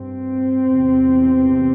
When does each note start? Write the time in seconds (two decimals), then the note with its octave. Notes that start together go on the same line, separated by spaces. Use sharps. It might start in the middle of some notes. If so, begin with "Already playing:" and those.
Already playing: G2 C4
0.70 E2 C3